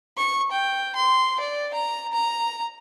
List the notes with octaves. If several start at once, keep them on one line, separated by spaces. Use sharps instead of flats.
C#6
G5
C6
D5
A#5
A#5